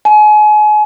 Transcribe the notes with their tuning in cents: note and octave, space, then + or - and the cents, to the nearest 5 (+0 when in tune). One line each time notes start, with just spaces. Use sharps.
G#5 +35